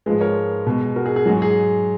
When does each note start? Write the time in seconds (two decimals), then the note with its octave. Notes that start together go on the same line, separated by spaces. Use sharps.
0.06 G#2 F3 G#3 G#4 B4
0.21 A#4 C#5
0.66 B2 G#3
0.96 F#4 A#4
1.06 G#4
1.16 G#4
1.26 G#2 F#3 F#4
1.42 G#4